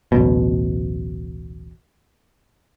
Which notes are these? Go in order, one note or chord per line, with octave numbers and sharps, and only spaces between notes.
D1 A1 B2